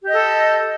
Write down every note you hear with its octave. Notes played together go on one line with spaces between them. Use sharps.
G4 A4 D#5